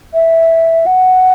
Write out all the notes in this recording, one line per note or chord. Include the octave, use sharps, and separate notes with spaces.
E5
F#5